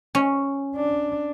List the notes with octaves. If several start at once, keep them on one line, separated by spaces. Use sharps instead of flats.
C#4
D4